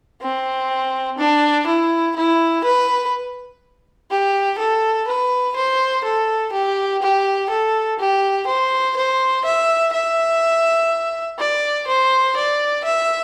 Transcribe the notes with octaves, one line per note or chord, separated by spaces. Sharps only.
C4
D4
E4
E4
B4
G4
A4
B4
C5
A4
G4
G4
A4
G4
C5
C5
E5
E5
D5
C5
D5
E5